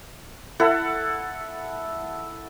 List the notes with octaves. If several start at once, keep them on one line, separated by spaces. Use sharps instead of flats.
E4 A4 F#5